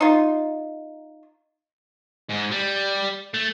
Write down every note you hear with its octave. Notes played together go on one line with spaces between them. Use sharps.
D#4 F4
G#2
G3
A3